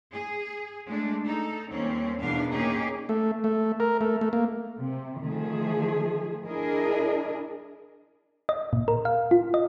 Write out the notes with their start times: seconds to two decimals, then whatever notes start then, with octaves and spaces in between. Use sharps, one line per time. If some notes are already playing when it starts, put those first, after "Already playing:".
0.12 G#4
0.87 G#3 A3 D4
1.25 D#4 A4
1.70 D#2 G3 C4 C#4
2.21 E2 B2 D#3 D4 F5
2.52 A#2 C#4 D#4 G4 G#4
3.09 A3
3.44 A3
3.80 A#4
4.01 A3
4.21 A3
4.33 A#3
4.79 C3
5.22 D#3 F3 A3 G#4
6.46 D4 E4 G#4 A#4 D#5
8.49 D#5
8.73 A#2
8.88 A#4
9.05 F5
9.31 F4
9.54 D#5